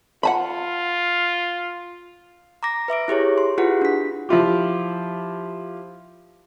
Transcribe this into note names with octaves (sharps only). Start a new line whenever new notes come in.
F4 F#5 A5 B5
A#5 D6 A#6
B4 E5 D6 D7
E4 G4 G#4 C#5
C6
E4 F4 G4 G#4 B4 F#5
D4 B6
F3 E4 F4 G4